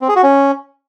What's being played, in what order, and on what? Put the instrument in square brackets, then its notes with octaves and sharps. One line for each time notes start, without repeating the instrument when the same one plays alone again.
[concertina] C4
G#4
F#4
C#4